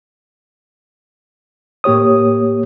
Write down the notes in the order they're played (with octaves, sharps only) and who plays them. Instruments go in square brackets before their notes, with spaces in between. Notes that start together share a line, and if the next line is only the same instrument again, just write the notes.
[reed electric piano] A2 A#3 G4 C#5 D#6